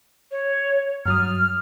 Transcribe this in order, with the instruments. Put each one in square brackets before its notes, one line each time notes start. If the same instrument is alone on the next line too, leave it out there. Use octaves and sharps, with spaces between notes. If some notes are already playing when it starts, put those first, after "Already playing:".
[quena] C#5
[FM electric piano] G2 F#3 D#6 [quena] F6